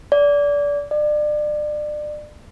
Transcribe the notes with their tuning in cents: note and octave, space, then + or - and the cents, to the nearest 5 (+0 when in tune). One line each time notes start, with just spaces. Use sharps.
D5 -25
D5 +30